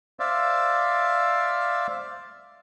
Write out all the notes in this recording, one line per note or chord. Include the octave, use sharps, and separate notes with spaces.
C5 D5 E5 F5